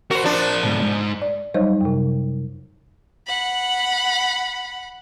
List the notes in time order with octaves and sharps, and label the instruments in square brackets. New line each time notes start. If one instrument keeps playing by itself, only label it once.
[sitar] F#4 [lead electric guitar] A#4 C5
[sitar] F3 D4
[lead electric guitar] G#2 B2
G#2
[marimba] D5
F#3 G3 D#4 C5 C#5 D#5
F#2 C3
[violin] F#5 B5